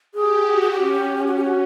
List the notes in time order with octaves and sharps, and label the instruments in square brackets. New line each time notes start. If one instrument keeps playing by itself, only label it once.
[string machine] G4 [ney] G#4
[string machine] F#4
[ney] G#4
[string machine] C#4 [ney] G4
[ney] F#4
G4
F#4